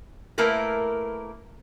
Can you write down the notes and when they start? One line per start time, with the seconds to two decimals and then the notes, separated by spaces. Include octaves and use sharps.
0.38 A3 A#3 E4 A#4 B4